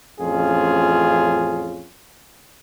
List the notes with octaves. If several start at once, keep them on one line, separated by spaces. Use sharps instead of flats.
A1 F2 C#4 F4 G#4